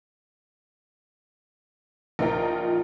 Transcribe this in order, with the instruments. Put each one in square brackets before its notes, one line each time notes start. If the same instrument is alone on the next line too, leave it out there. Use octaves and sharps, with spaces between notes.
[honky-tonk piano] A#1 D#4 F4 A#4 G5